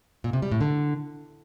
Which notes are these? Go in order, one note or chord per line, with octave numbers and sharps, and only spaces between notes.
A#2
C3
G3
A2
D3